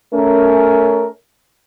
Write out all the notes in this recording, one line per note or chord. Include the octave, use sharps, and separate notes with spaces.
A3 C#4 A#4